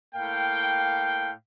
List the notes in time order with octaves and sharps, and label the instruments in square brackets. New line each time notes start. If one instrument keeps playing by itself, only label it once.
[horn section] A2 A#3 F5 G5